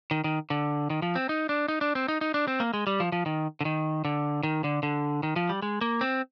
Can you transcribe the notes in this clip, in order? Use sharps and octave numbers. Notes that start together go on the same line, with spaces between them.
D#3
D#3
D3
D#3
F3
C4
D#4
D4
D#4
D4
C4
D#4
D#4
D4
C4
A#3
G#3
G3
F3
F3
D#3
D3
D#3
D3
D#3
D3
D3
D#3
F3
G3
G#3
A#3
C4